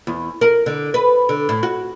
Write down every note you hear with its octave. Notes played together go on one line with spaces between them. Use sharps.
E2
A#4
D3
B4
D3
A2
F#4